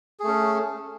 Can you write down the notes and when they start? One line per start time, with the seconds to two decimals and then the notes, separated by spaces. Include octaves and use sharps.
0.20 G#4
0.23 A3
0.27 C#4